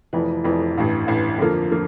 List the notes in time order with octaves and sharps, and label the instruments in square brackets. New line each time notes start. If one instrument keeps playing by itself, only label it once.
[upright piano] F1 F2 E3
F1 F2 E3
A1 G2 E3
A1 G2 E3
F2 D3 F3 A#3
D3 F3 A#3